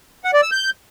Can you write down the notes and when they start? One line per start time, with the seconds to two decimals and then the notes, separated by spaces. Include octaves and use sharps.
0.24 F#5
0.33 D5
0.42 E6
0.52 G6